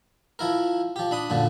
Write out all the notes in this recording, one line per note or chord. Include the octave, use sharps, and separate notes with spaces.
F3 E4 A#4
F3 G4
D4 B5 D#6
F#2 A#2 D3 F3